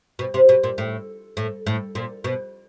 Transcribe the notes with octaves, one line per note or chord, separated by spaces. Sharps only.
B2
C3
B2
A#2
A2
A2
A2
A#2
B2